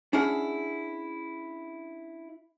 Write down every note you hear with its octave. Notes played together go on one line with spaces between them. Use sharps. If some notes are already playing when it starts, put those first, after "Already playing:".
C#4 D4 E4 G#4 F#5